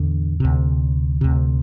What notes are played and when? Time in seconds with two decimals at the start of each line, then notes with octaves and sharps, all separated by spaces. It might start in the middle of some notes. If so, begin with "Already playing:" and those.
Already playing: E2 A2 D3
0.40 D2 C3
1.21 D2 C3